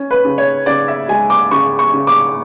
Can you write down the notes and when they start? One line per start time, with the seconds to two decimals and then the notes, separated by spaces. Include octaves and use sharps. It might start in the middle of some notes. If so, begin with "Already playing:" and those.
Already playing: C#4
0.11 B4
0.25 C#3
0.38 C#5
0.66 C#3 D5
0.88 E5
1.09 G#3 G#5
1.30 D6
1.51 C#3 C#6
1.79 C#6
1.93 C#3
2.07 D6